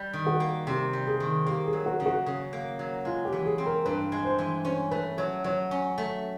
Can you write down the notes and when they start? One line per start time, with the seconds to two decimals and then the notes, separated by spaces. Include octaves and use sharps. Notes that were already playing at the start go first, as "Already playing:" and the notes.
Already playing: G3
0.13 D#3
0.27 F#4
0.40 A#3
0.67 C3 G4
0.93 G3
1.07 G#4
1.20 D#3
1.46 A#3 G4
1.66 G#4
1.73 F#3
1.86 F#4
2.00 C#3
2.06 F#4
2.26 C#3
2.53 A#3
2.79 F#3
3.05 G#3 F4
3.25 G4
3.33 E3
3.46 G#4
3.58 C4
3.66 A#4
3.85 G2 B4
4.12 G#3
4.25 C5
4.38 E3
4.65 C#4 C5
4.91 A3 B4
5.18 F#3 C#5
5.44 F#3 C#5
5.71 C#4
5.98 A3